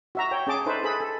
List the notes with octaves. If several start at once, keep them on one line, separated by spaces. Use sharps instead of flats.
F#4 E5 A#5
C#5 G5
C#4 G#4 A5 D6
D#4 A4 B4 C5 E5
G#4 A4 B4 B5
A4